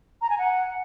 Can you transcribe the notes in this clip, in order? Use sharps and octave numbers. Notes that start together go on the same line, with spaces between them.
A#5
G#5
F#5